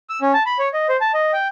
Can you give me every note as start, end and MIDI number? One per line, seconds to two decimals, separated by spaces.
0.10 0.19 88
0.22 0.33 61
0.34 0.43 81
0.46 0.58 83
0.59 0.68 73
0.74 0.87 75
0.89 0.97 72
1.01 1.12 81
1.14 1.32 75
1.33 1.48 79